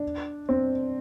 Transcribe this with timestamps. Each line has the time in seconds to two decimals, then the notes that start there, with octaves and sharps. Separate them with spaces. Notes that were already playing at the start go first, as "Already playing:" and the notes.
Already playing: D4
0.49 C4